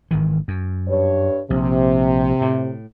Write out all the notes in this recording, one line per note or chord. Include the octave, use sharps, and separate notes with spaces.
G#1 D#3 E3
F#2
G2 C#5
A#1 C3
A2